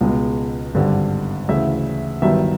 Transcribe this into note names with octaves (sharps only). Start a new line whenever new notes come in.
C#2 B2 G#3
G#1 G2 D3 G3
D2 C#3 E3 E5
G1 G2 D#3 F#3 E5